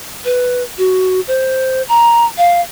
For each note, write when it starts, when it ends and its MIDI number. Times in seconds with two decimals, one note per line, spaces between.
0.25 0.63 71
0.78 1.20 66
1.28 1.82 72
1.89 2.25 82
2.38 2.61 77